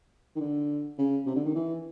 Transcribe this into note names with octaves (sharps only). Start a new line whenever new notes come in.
D#3
D3
C#3
C3
D3
D#3
E3